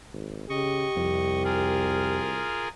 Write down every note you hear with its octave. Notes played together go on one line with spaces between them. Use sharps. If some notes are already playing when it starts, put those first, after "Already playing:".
G#1
C#3 G4 D#5 C#6
C2 F2
F4 G#4 A#4